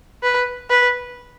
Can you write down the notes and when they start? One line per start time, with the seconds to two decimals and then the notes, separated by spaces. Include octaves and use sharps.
0.23 B4
0.70 B4